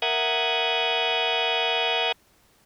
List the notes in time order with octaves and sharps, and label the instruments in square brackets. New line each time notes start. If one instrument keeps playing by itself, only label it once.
[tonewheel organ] A#4 E5 F#5 D#6 F#6 G#6